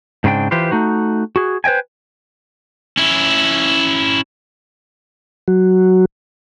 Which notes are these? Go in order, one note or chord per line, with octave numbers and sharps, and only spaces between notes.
G#2 C#3 C4 D4 G5
E3 F4 G4 B4 C5
A3 D#4 F#4
F#4 G#4
B4 C5 D#5 G5 G#5
C#4 E4
F#3 F#4